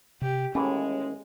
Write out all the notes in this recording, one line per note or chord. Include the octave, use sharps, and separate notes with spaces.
C3 G4
D#2 A2 E3 G#3 C#4